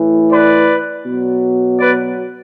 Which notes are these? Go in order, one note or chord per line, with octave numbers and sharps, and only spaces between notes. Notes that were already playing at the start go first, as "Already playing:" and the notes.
Already playing: A2 E3
B4 D5
B2 F#3
B4 D5